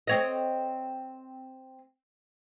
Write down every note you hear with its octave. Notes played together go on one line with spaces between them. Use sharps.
C4 C#5 D#5